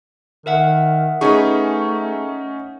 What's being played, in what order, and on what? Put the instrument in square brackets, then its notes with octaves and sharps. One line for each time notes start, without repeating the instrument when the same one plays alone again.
[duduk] D#3 [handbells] A#4 E5 F#5
[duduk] A3 [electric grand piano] C#4 D#4 C#6 [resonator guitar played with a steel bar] G#4 B4